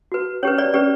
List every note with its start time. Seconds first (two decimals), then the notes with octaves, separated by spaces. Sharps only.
0.12 F#4 B4
0.43 C#4 G4 B4 C#5
0.58 D5
0.74 C#4 G4 B4 D5